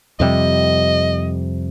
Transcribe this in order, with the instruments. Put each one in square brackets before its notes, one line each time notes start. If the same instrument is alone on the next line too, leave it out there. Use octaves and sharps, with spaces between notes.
[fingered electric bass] F2 C3 G3 [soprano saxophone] D#5